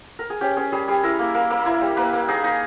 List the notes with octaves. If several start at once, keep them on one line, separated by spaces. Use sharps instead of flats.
A#4
G#4
C#4 G4
C#4 G#4
G3 G#4
G3 G#4
E4 A#4
A#3
A#3
A#3
E4
G3
A#3 B4
A#3
D#4 G#4
D#4